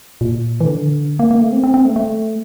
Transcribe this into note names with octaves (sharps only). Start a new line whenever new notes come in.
A#2
E3
D3
A#3
A#3
A3
C4
C4
C4
A3
A3